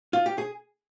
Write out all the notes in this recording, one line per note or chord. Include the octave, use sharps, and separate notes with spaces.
F4
G4
G#4